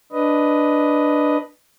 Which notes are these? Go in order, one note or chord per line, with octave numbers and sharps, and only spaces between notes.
D4 B4 D#5